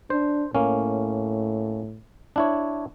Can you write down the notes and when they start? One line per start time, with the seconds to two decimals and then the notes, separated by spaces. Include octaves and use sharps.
0.10 D4 C5
0.55 A2 A#3 C#4
2.36 D4 E4 C#5